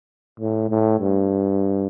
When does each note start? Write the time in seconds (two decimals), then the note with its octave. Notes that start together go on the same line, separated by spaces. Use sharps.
0.40 A2
0.70 A2
1.00 G2